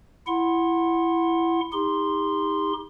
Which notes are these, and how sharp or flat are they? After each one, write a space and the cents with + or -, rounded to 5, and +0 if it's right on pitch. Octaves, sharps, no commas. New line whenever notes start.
E4 +20 F#5 +0 C6 +25
D#4 +35 G4 +40 C6 +0